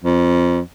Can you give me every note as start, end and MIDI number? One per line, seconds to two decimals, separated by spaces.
0.04 0.61 41